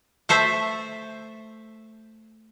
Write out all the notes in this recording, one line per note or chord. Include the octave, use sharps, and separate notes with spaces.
A3 A4 C5 E5